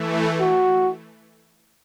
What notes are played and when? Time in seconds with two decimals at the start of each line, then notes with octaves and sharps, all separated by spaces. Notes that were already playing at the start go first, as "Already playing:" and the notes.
Already playing: E3 A3
0.41 F#4